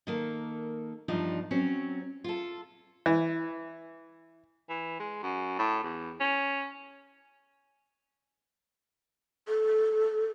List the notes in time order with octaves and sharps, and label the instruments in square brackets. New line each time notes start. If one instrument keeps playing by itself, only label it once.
[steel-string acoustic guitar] D#3 A#3 A4
E2 G2 F3 D4 D#4 G4
F#3 C4 C#4
F4 A4
[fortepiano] E3
[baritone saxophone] E3
G#3
F#2
A2
E2
C#4
[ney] A4